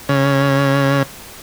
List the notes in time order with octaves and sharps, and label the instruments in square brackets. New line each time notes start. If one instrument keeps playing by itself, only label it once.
[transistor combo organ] C#3